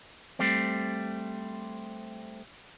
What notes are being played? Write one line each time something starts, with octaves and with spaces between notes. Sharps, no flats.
G3 A3 C4